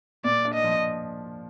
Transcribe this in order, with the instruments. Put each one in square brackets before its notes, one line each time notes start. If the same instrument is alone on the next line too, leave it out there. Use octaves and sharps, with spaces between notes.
[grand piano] A#2 [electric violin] D5
[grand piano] D4
[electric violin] D#5
[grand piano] F3